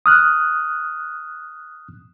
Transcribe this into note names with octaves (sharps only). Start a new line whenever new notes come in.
D#6 F6 F#6